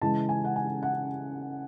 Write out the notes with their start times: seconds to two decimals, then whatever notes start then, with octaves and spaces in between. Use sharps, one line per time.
0.02 C#3 E3 G#3 A5
0.29 G#5
0.44 F#5
0.56 G#5
0.83 F#5